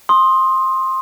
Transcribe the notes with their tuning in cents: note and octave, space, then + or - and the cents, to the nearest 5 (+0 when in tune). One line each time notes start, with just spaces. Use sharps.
C6 +15 D#6 +0